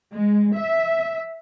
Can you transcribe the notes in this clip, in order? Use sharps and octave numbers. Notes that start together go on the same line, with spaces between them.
G#3
E5